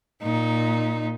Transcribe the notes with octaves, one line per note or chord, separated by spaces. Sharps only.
A#2 D#4